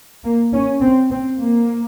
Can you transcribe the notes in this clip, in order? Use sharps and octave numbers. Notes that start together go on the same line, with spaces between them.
A#3
C#4
C4
C4
A#3